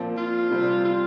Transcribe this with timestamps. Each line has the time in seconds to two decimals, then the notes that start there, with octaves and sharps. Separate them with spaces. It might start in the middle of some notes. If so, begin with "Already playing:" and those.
Already playing: A#2 F3 C4
0.17 F4
0.51 C3 G3 C4
0.85 F4